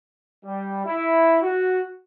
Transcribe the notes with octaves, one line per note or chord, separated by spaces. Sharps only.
G3
E4
F#4